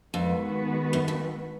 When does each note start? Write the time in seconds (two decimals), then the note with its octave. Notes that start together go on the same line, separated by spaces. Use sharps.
0.13 F2 D#3 G#3 B3 F#4 B4
0.93 F#2
1.08 F2